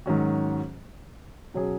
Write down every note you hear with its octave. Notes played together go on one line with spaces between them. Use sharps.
G#2 D#3 F#3 C#4 F#4
B2 F#3 C#4 G#4